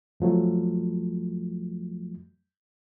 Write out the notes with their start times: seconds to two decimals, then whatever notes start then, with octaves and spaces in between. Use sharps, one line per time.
0.20 F2 F3 F#3 A3